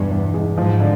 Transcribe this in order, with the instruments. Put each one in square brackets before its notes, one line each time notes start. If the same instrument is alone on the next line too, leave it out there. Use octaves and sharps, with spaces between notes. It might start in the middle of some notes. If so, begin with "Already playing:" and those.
Already playing: [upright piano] E2 B2 [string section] G2
[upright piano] E2
G#3
[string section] G#2 [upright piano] F3
[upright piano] D3